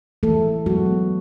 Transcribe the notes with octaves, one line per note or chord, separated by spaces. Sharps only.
E3 A3 A4
F#3 G#3 B3 F#4